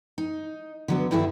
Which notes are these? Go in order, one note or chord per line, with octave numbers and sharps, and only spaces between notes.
D#4
D3 F#3 B3
G2 D#3 E4 G#4 A4 E5